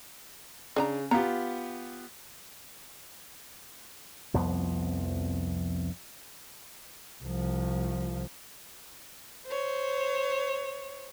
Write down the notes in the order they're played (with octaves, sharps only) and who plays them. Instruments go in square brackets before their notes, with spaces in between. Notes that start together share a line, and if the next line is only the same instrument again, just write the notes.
[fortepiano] C#3 [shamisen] D4 D#5 A#5
[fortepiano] B3 F4 G4 [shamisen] A#5
[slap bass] C2 F2 F3 B3
[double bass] C2 F3
[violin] C5 C#5